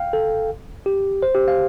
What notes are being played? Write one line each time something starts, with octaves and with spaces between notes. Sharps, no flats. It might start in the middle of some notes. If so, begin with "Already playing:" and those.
Already playing: F5 G5
A4
G4
C5
G4
F5